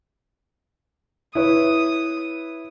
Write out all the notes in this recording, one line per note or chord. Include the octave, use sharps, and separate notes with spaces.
E4 B4 C#5 D#6